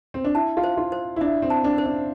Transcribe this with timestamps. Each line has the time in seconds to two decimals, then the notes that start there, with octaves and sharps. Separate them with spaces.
0.14 C4
0.24 D4
0.35 E4 A5
0.57 F4
0.64 C5
0.77 F4
0.92 C5
1.16 E4
1.21 D4 E5
1.42 C4
1.50 A5
1.64 D4
1.78 C5
1.86 D4